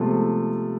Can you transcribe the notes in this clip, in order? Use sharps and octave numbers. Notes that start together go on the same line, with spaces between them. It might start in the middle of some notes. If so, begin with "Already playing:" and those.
Already playing: C3 F3 G#3 A3 B3